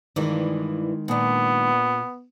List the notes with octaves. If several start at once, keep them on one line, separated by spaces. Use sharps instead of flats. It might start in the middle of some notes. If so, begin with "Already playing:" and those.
G2 D#3 E3 G#3
A#2 B3 D4